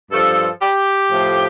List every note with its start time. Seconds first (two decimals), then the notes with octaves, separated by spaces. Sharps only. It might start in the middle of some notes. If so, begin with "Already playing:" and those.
0.12 G2 F3 A4
0.62 G4
1.11 A2 F3